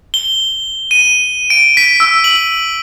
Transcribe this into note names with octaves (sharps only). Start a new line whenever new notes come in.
G7
D#7
D7
B6
E6
F#7